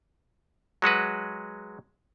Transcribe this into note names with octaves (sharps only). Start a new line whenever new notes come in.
F#3 G#3 F#4 B4